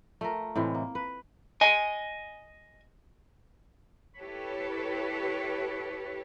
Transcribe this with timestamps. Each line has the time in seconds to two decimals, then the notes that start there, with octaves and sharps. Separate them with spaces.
0.21 A3 F4 A#4
0.56 A2 C3 E3 G#3
0.74 A#3
0.95 B4
1.61 D#5 G#5
4.19 E4 G4 A4 B4 C#5